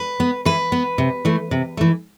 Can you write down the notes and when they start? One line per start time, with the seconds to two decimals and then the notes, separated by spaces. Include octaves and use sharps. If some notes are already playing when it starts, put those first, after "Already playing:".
Already playing: B4
0.20 B3
0.45 E3 B4
0.72 B3
0.98 C3
1.25 E3 A3
1.51 C3
1.77 E3 A3